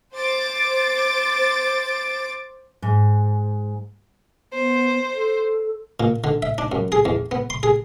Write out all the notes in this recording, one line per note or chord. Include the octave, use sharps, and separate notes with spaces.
C5 D6 A6 D7
G#2
B3 C5
A4
A#2
D3
E5
D4
F#2
G#4
E2
B3
C6
G#4